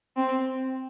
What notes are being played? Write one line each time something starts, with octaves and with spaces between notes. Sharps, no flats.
C4